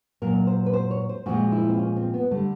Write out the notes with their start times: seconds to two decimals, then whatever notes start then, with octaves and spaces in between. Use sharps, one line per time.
0.22 A#2 F#3 A#4
0.47 C5
0.66 B4
0.73 C5
0.91 C#5
1.09 C5
1.26 A#2 F3 G#3 F#4
1.52 E4
1.69 C4
1.79 C#4
1.96 C4
2.14 B3
2.31 D3 G3 A3